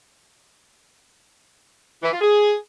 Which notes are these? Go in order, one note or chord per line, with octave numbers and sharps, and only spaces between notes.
E3
F4
G#4